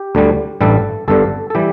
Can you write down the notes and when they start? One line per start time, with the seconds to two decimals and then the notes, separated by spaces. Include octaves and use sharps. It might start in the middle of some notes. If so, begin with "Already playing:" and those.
Already playing: G4
0.15 D2 D3 G3
0.61 A1 G2 G3 A4
1.08 G1 G2 D3 A4
1.50 A4
1.55 E3 G3 G4